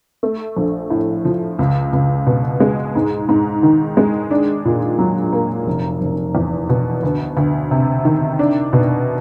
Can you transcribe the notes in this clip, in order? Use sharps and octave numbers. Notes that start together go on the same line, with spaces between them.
A3
A#1
A2
F3
C#2
C#2
B2
G#3
G#2
G#2
D#3
G#3
D4
A#2
F#3
A#3
F1
F1
E2
B2
D2
D2
C3
D#3
D4
B2